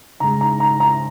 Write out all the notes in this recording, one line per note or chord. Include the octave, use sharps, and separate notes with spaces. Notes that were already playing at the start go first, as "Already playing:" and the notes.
C#3 G#3 A#5
A#5
A#5
A#5